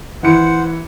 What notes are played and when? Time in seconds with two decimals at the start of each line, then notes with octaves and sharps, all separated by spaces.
0.23 E3 C5 F#5 C#7